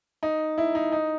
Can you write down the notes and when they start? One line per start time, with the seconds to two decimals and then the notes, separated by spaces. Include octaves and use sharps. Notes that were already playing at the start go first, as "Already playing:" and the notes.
0.23 D#4
0.58 E4
0.75 D#4
0.92 D#4